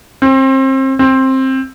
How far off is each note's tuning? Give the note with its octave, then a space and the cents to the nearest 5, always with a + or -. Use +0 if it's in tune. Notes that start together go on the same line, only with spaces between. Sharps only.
C4 +30
C4 +15